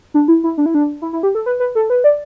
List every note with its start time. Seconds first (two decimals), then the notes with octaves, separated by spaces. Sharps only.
0.14 D4
0.28 E4
0.44 E4
0.58 D4
0.66 E4
0.74 D4
1.02 E4
1.13 E4
1.23 G4
1.35 A4
1.46 B4
1.60 B4
1.75 A4
1.90 B4
2.04 D5